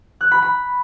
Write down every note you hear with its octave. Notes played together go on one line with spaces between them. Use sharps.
F#6
B5
B5